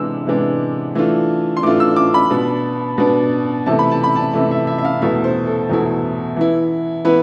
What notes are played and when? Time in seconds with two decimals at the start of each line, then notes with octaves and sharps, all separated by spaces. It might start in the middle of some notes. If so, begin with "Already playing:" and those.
Already playing: C3 E3 G#3 B3 D4 E6
0.27 C3 E3 G#3 B3 D4
0.95 E3 A3 D4 F4
1.57 C6
1.63 E3 A3 D4 F4 D6
1.80 E6
1.96 D6
2.14 B5
2.30 B2 B3 D4
2.98 B2 B3 D4
3.66 C3 E3 A3 A5
3.79 B5
3.91 A5
4.04 B5
4.16 A5
4.33 C3 E3 A3
4.51 E5
4.67 E5
4.78 E5
4.85 F5
5.01 E2 B2 A3 E4 E5
5.24 C5
5.47 A4
5.69 E2 B2 A3 E4
6.36 E3 B3 E4
7.05 E3 B3 E4 B4